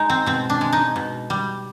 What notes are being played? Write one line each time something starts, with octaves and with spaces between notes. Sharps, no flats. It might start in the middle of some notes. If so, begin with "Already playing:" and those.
Already playing: G#3 D#4
C4
B2 C4
D4
G#3
D#4
B2
G3